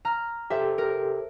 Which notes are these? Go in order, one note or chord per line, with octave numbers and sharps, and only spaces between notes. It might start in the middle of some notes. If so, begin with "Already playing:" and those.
A#5 F6
G4 A4 C5 E5
A#4